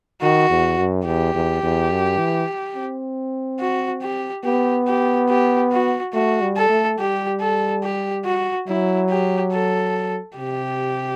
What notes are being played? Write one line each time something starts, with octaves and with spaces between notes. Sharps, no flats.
D#3 F#4
E2
F#2
E2 G4
E2
E2
F#2
E3
C4
F#4
G4
B3 G4
G4
G4
F#4
A3 F#4
G3
A4
A3
G3 G4
A4
G4
F#4
F#3 E4
G4
A4
C3 G4